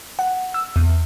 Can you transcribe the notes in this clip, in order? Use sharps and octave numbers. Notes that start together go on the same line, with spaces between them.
F#5
E6
E2